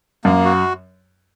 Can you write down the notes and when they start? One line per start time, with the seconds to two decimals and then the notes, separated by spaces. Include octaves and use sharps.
0.24 F#2 A#3
0.45 F#4